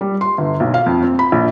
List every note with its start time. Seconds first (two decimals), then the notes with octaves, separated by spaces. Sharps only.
0.01 G3
0.21 C6
0.38 G1
0.60 B1
0.74 F5
0.86 F2
1.02 C4
1.19 B5
1.32 A#1